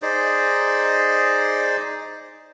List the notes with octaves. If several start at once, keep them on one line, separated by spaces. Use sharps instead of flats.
D#4 G#4 C5 D5